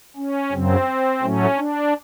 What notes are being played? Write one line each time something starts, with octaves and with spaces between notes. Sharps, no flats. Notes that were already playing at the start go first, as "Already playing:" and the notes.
C#4
F#2 C#3 F#3 C4
A2 F#3 A3 C#4
D4